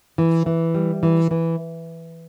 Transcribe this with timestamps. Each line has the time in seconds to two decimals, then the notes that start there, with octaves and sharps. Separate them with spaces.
0.18 E3
0.46 E3
0.74 G3
1.03 E3
1.31 E3